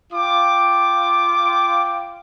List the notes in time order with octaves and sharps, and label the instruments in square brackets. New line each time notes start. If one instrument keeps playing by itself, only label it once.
[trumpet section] F4 G5 D6